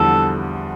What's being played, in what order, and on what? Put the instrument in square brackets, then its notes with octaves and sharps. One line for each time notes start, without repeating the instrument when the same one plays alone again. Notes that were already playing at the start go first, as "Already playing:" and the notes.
Already playing: [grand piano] E2 D3 E3 F3 G3 [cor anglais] A4